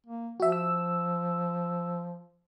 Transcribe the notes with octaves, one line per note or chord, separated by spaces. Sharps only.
A#3
F3 F#4 E5
E6